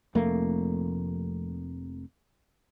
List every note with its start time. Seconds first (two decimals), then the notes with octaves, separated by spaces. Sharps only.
0.15 F1 F2 A3 A#3